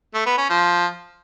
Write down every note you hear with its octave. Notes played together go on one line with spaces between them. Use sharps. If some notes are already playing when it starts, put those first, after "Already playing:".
A3
B3
C#4
F3